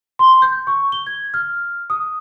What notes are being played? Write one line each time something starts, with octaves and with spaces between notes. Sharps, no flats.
C6
G6
C#6
G7
G#6
F6
D#6